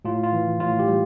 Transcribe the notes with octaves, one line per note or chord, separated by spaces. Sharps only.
A2 F4
F4
E3
A2 F4
G4
G3